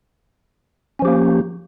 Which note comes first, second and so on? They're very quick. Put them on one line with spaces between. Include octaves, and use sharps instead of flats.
C#4 F3 G4 A#3